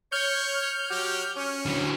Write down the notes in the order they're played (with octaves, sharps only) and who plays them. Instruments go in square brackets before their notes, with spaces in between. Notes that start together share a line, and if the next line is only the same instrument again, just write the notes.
[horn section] C#5 [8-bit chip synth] F6 G6
[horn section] F#3 F#4 G4
C#4
[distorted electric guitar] D3 F#3